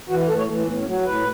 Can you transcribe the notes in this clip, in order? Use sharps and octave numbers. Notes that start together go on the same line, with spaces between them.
E3 F#4
A2 A4
C#5
E3
A3
A2 B3
C#4
F#3
F#4
A2 B4